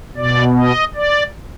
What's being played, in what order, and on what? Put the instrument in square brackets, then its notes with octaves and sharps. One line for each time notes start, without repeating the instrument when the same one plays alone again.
[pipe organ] B2 D5
D#5
D5